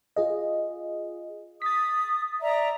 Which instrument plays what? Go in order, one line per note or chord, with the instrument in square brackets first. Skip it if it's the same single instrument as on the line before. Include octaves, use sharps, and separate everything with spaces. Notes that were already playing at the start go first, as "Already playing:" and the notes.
[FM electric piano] F4 G#4 D#5
[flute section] D#6 [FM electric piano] A6 B6
[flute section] D5 E5 A#5